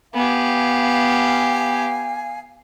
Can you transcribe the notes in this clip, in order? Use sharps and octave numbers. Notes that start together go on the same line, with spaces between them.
B3 G4 F5 G#5